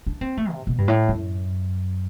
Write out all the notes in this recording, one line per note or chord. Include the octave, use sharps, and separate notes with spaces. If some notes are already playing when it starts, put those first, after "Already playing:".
D4
C4
A3
C3
B2
G2
A2
F#2